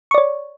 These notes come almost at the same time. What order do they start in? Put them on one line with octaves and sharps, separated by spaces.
C#6 D5 C#5